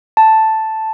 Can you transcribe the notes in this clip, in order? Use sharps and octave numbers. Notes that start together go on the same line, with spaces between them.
A5